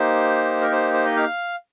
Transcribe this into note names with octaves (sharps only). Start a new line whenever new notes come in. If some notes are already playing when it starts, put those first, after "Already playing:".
Already playing: A#3 D#4 G4 C5
A#4
C5
C5
D#5
F5